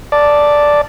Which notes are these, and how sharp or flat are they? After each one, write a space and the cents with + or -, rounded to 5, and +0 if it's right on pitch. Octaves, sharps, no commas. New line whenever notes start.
D5 +0 A5 +0